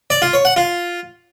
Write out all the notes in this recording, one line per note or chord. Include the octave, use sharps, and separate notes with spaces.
D5
F4
C#5
F#5
F4